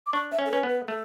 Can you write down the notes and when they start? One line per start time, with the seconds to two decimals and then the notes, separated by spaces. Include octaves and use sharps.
0.07 D6
0.13 D4 C#6
0.32 E5
0.39 C#4
0.45 A4
0.51 C#4 B4
0.63 B3
0.69 B4
0.88 A3 A4